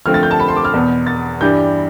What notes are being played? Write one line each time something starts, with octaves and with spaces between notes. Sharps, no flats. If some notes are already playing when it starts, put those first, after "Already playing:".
D3 F3 A3 C4 F6
A6
G6
A5
B5
C6
D6
F6
E2 B2 B3
A6
G2 E3 G3 D4 G6